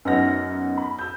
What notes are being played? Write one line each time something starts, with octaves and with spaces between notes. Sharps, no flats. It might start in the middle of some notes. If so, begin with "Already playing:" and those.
F#2 B3 D#4 F#5 F6 A#6
B5
E6 G6